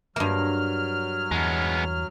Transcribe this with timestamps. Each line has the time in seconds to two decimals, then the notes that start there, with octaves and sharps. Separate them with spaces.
0.16 G2 F#3 A#3 F6
1.31 E2 G#3 B3